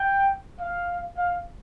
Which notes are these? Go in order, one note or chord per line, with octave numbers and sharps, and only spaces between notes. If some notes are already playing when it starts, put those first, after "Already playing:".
Already playing: G5
F5
F5